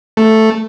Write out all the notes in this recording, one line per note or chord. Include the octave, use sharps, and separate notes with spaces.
A3